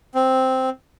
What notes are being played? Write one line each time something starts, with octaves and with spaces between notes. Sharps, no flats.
C4